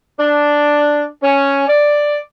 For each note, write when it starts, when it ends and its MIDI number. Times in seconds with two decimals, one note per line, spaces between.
0.19 1.05 62
1.23 1.64 61
1.67 2.18 74